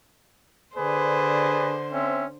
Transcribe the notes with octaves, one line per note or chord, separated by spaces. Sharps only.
D3 G#4 B4 C5 D5
C4 C#4 E5